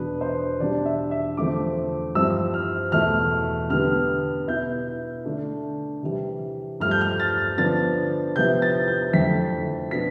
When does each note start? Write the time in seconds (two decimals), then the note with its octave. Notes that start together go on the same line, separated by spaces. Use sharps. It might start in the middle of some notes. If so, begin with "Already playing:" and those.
Already playing: E2 B2 B3 D4 B4
0.21 C5
0.60 E2 B2 G3 D4 D5
0.85 E5
1.11 E5
1.37 E2 D3 F3 A3 C4 D6
2.15 G2 F3 C4 E4 E6
2.54 F6
2.92 E2 B2 A3 E4 F6
3.70 D3 G3 B3 F6
4.48 B2 B3 E4 G6
5.25 D3 A3 D4
6.03 C3 E3 G3
6.80 G2 F3 A3 F6
6.91 G6
7.01 F6
7.20 A6
7.58 D3 F3 B3 D4 A6
8.36 C3 F3 B3 E4 G6
8.62 A6
8.88 G6
9.13 F2 D3 A3 E4 B6
9.91 B2 B3 D4 B6